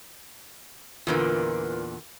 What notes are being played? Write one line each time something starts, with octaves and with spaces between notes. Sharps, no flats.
E2 A#2 D3 F4 A#4 B4